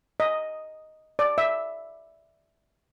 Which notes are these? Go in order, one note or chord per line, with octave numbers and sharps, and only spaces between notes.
D#5
D5
E5